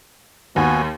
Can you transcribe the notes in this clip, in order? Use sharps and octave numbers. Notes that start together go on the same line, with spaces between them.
D#2 B3 F#4 G#5